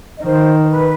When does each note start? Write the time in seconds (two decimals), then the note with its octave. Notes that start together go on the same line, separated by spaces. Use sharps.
0.18 D#5
0.23 D#3 C5
0.63 C5
0.70 B4